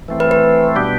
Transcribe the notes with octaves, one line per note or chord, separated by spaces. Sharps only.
E3 A3 C4
B4
B4
B2 G3 B3 D4 G4